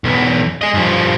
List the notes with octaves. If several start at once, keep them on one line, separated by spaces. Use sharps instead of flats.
B1 E2
G#4 D#5
G2 F3